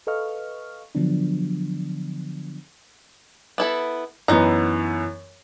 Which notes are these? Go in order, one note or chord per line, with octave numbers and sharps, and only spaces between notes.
A4 B4 D#5 F5 C#6 F6
D3 F3 F#3 B3 D4
B3 E4 A4
F#2 E3 B3 D#4 A#5